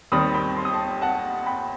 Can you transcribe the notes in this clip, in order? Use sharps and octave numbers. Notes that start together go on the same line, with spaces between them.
D#2 D#3 G3 C4 B5 D#6
G5 B5
C6
D#6
A5 C6
F#5 A5
G5 B5